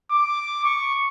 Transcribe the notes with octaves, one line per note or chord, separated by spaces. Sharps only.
D6
C#6